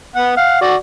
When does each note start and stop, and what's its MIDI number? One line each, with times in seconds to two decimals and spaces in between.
0.16 0.33 59
0.16 0.33 78
0.37 0.59 77
0.37 0.59 78
0.61 0.75 66
0.61 0.75 74